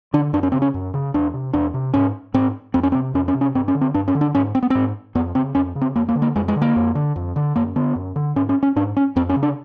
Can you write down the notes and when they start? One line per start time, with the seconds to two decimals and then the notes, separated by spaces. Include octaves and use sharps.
0.14 D3 D4
0.33 F#2 D4
0.43 C#4
0.52 C#3 C4
0.62 C#4
0.74 F#2
0.94 C#3
1.14 E2 D4
1.34 C3
1.53 E2 D4
1.74 C3
1.94 G#2 C#4
2.34 G#2 C4
2.74 F2 C4
2.83 C#4
2.92 C4
2.95 C3
3.14 F2 C#4
3.28 C#4
3.34 C3
3.41 C#4
3.55 G2 C4
3.68 C#4
3.75 D3
3.81 C4
3.94 G2 D4
4.08 C#4
4.15 D3
4.21 D4
4.35 G#2 C#4
4.55 C4
4.62 B3
4.70 G#2 C4
5.15 F2 B3
5.35 C#3 C4
5.55 F2 C#4
5.75 C#3
5.81 C4
5.95 F2 A#3
6.09 A#3
6.15 D3
6.22 A#3
6.36 F2 G#3
6.48 G#3
6.56 D3
6.62 A#3
6.76 F2
6.95 D3
7.16 F2
7.36 D3
7.56 F#2 A#3
7.76 D3 B3
7.95 F#2
8.16 D3
8.36 G#2 C#4
8.49 C#4
8.63 C#4
8.76 G#2 D4
8.97 C#4
9.16 F2 C4
9.29 C#4
9.36 C#3
9.43 D4